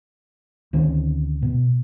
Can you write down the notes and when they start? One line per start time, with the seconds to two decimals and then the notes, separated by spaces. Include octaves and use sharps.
0.73 D2 D#3 C4 C#4
1.42 B2